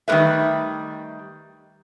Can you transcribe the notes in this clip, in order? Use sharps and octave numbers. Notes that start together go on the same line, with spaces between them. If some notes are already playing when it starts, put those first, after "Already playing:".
D#3 G3 A3 A#4 B4 E5